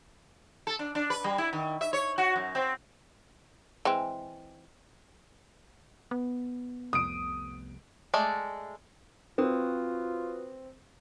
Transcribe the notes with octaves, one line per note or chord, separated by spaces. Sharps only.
A4
D4
D4
B4
G3
E4
D#3
E5
C#5
F#4
F#2
C4
E3 G#3 C4
B3
F1 C2 D#6 D7
G#3 A3 D5
C4 F4 F#4 B4 D#6